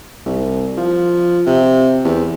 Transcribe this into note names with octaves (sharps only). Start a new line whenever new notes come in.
C2
F3
C3
E2